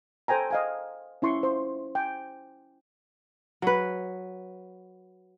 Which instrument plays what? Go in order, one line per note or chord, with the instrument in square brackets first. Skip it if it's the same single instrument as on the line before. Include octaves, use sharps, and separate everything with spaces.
[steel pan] A4 C5 G5 G#5 A#5
D#5 F5 G#5
C#4 E4 C6 C#6
C5
G5 G#5
[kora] F#3 B4